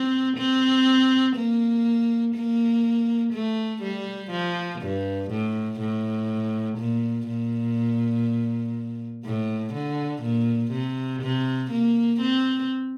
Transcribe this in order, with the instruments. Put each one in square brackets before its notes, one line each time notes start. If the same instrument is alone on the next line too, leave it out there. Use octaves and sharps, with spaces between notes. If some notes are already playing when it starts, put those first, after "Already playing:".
Already playing: [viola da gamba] C4
C4
A#3
A#3
A3
G3
F3
G2
A2
A2
A#2
A#2
A2
D3
A#2
C3
C3
A#3
C4